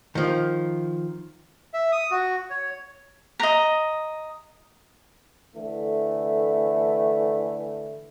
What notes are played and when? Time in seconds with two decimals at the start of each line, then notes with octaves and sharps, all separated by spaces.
0.15 D#3 F3
1.74 E5
1.92 D#6
2.11 F#4
2.50 C#5
3.39 D#5 A#5
5.55 D3 E3 A3